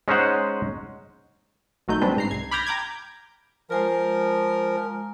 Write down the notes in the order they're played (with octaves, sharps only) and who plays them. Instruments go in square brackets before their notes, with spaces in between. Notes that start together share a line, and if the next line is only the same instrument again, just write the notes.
[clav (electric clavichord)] G#3 C#4 D#4 C5 F#5
[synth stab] A1 F#3 A3 D#4 G6
C#3 G3 G#3 C4 D4 B4
G#2 A#5 C7
C2 G#6
B5 D6 F6 G6 G#6 A#6
G5 A#5 D6 G6 G#6
[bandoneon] F3 A#4 [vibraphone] G#3 G#5 A#5